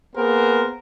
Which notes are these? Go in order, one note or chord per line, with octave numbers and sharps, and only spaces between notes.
A#3 B3 G#4 A#4 C5